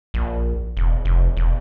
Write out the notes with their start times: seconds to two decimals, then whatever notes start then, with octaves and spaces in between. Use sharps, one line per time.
0.14 A#1
0.77 E1
1.05 F1
1.37 E1